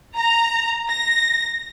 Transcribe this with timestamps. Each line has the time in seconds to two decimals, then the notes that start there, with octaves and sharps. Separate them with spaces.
0.16 A#5
0.89 A#6